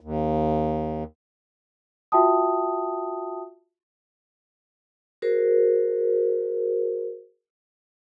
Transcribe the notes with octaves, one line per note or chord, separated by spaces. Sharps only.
D#2
F4 F#4 E5 G5 A5 D#6
F#4 G#4 A#4 C5